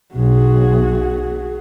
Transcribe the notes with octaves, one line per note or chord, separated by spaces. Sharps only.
B1 F#4 G#4